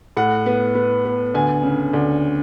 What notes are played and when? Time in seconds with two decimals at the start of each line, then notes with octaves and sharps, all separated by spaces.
0.17 A2 F#5
0.46 B3
0.75 B3
1.05 B3
1.34 D2 G#5
1.63 C#3
1.93 D2